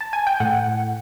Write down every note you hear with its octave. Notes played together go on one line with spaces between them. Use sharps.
A5
G#5
G5
A2 F#5